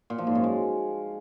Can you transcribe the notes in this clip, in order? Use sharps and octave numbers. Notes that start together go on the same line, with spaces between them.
A#2
F3
G#2
F#2
G#3